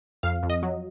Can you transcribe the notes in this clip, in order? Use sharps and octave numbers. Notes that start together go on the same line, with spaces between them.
F2 F5
F2
D#5
F#3